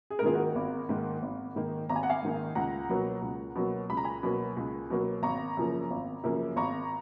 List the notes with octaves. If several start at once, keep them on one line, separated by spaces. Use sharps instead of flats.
G#4
A#4
G#2 D#3 A#3 F4 G#4
F#4 A#4
G#1
G#2 D#3 A#3
G#1
G#2 D#3 A#3
G#1 A#5
G#5
F#5
F5 G#5
G#2 D#3 A#3
C#2 F#5 A#5
B2 F#3 A#3
C#2
B2 F#3 A#3
C#2 B5
A#5
G#5 B5
B2 F#3 A#3
C#2
B2 F#3 A#3
G#1 A#5 C#6
F#2 C#3 F3 A#3
G#1
F#2 C#3 F3 A#3
G#1 A#5 C#6